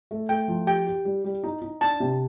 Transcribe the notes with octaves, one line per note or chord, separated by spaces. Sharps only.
A3
A3 G5
F3
G4 G5
G4
G3
G3
D#4
D#4
D4 A5
C3